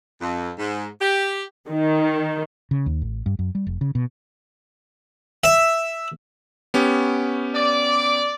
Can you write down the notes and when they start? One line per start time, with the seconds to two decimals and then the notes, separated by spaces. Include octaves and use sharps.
0.21 F2
0.59 G#2
1.01 G4
1.70 D#3
2.71 C#3
2.86 D#2
3.02 A1
3.26 G2
3.39 F#2
3.55 G3
3.67 F1
3.81 C#3
3.95 B2
5.44 E5
6.74 B3 C#4 G4
7.54 D5